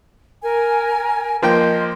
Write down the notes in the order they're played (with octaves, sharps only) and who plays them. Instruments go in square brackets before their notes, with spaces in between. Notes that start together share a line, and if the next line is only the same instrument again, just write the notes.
[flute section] A#4 G#5
[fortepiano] F3 A#3 G5 [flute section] D#5 C6